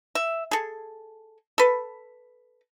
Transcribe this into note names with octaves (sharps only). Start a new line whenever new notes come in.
E5
G#4 A4
A4 B4